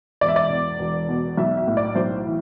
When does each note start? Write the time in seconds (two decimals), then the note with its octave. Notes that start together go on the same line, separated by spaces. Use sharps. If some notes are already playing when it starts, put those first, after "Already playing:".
0.21 E1 D5
0.28 E5
0.36 D5
0.50 E2
0.79 E1
1.09 B2
1.37 B1 E5
1.57 E5
1.67 A2
1.77 D5
1.95 B1 C5
2.25 E3